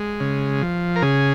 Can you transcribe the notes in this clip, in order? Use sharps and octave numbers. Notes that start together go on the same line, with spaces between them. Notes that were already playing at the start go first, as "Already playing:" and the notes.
Already playing: G#3
C#3
F3
A#4
C#3 G#4